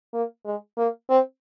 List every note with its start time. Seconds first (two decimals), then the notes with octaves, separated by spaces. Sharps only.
0.13 A#3
0.45 G#3
0.77 A#3
1.09 C4